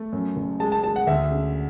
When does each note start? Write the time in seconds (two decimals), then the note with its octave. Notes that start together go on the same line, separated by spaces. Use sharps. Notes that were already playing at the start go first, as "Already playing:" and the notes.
Already playing: A3
0.12 F#2
0.36 F#1
0.60 G#3 A5
0.72 A5
0.83 G#3 A5
0.96 F#5
1.07 D2 E5
1.31 C#3